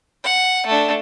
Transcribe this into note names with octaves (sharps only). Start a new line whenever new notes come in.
F#5
A3 D4